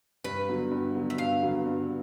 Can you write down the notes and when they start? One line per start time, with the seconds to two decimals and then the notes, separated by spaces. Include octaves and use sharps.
0.24 G2 B4
0.48 D3 F#3 B3
0.71 G2
0.95 D3 F#3 B3
1.10 E5
1.18 G2 F5
1.42 D3 F#3 B3
1.66 G2